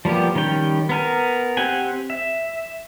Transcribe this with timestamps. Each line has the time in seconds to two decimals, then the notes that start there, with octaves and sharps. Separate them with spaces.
0.05 F3 G3 A#3 B3 G4
0.35 D#3 G3 C#4 G5
0.89 B3 A#4 G#5
1.57 C4 G4 F#5 G#5
2.10 E5